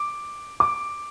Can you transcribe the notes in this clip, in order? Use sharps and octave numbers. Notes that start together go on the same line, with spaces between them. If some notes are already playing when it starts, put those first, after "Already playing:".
Already playing: D6
D6